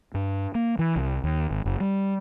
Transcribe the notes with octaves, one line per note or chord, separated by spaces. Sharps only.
G2
A#3
E3
C2
D#2
G#1
F#1
G3